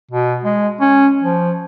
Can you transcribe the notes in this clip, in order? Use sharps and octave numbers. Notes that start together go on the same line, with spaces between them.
B2
G#3
C#4
F3